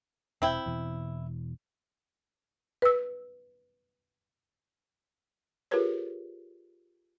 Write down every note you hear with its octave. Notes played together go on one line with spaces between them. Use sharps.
E1 C4 E4 G5
E1 B2 E3
B4 E6
F4 G4 G#4 A#4 B4 C#5